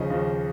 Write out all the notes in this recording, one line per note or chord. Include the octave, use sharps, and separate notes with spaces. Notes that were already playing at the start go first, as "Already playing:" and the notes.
Already playing: D#2 C#3 F3 D#5
D#2 C#3 F3